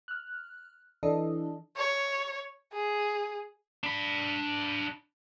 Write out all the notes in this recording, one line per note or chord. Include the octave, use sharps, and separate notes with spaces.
F6 F#6
E3 D4 A4 D#5
C#5
G#4
D4 B5